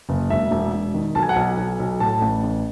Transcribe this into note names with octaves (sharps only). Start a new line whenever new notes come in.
F#1
E1 E5
E1
E1
D#3
B1 A5
G#5
F#5
B1 G#5
B1
B1
A2 A5
A1
A1